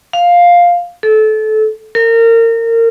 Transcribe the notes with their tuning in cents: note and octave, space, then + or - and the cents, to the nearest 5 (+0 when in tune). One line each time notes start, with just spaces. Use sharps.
F5 +5
A4 -25
A#4 -30